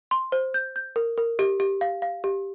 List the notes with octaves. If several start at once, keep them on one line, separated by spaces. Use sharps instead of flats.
C6
C5
G6
G6
A#4
A#4
G4
G4
F5
F5
G4